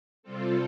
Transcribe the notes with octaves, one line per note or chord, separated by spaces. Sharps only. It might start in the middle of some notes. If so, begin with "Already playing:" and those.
C3 G3 C4 F4 A4